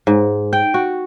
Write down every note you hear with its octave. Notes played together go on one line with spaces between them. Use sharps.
G#2
G5
F#4